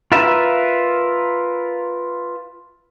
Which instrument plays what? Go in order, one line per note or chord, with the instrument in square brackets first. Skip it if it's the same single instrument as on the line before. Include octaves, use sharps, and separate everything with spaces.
[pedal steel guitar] F4 A#4 B4 E5